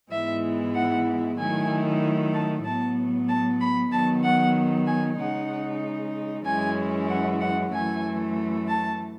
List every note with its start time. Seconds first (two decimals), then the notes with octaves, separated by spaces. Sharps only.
0.11 G#2 E3 G#3 B3 E4 E5
0.75 F#5
1.38 D#3 F#3 A3 E4 G#5
2.33 A5
2.64 A2 F#3 B3 A5
3.28 A5
3.61 B5
3.92 D#3 F#3 B3 A5
4.23 F#5
4.87 G#5
5.19 C#3 G#3 D#4 F#5
6.45 F#2 E3 G#3 C#4 E4 G#5
7.09 F#5
7.41 F#5
7.72 F#2 E3 A3 G#5
8.68 A5